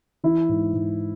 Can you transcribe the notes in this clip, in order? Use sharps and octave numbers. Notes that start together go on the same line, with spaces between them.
E3 E4
G#2
G#2